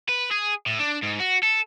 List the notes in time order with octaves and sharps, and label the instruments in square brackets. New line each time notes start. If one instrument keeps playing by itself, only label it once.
[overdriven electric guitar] B4
G#4
A2
D4
G#2
F#4
A4